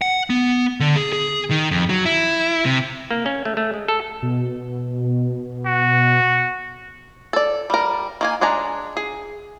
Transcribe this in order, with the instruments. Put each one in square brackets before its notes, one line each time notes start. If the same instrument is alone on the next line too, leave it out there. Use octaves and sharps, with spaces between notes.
[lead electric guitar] F#5
B3
D3
G#4
G#4
D#3
F2
F#3
E4
C3
[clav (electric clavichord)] A#3
C#4
A3
A3
G#3
A4
[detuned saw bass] B2
[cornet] F#4
[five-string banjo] A4 D5
G3 A#4
D#3 A#3 G#5
G#3 D4 G#5 A#5
G#4